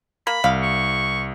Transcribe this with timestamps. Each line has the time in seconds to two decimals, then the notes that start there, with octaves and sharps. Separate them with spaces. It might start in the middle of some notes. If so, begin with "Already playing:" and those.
0.27 A#3 B5
0.44 C2 F5
0.63 C#6